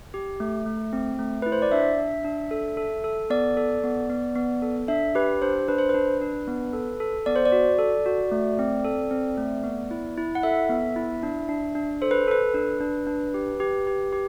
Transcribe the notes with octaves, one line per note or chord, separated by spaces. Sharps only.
G4
A3
A3
C4
A3
E4 B4
C5
D5
D4 E5
D4
D4
A4
A4
A4
B3 D5
A4
B3
B3
B3
A4
D4 E5
G4 B4
D4 C5
D4 B4
C5
D4 B4
D4
B3
A4
A4
B3 D5
C5
D5
F#4
A4
F#4
A3
C4
A4
C4
A3
B3
E4
E4
F#5
A4 E5
B3
E4
D4
D4
D4
A4 C5
B4
A4 B4
D4
D4
D4
G4
G4
G4
G4